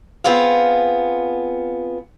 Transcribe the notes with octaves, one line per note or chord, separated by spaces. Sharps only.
B3 C4 F4 G#4 F5